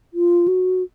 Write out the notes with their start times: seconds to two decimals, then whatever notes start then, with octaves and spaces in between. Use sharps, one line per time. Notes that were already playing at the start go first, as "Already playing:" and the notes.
0.14 F4
0.48 F#4